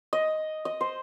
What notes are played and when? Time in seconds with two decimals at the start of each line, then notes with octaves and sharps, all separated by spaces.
0.13 D#5
0.65 D#5
0.81 C5